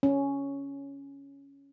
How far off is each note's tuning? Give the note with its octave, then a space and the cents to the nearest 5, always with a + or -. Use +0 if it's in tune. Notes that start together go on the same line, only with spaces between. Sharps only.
C#4 +5